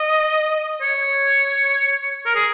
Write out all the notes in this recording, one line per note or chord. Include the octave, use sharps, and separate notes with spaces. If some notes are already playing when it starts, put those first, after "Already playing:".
Already playing: D#5
C#5
A#4
G#4